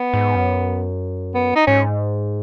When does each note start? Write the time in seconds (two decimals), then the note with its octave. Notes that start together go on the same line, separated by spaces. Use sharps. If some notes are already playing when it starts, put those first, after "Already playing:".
Already playing: B3
0.14 G#2
0.35 F#2
1.34 B3
1.56 D#4
1.67 G#2 C#4